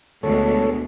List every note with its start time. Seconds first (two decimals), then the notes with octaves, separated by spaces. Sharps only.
0.23 D2 B2 G#3 A3 A4 C#5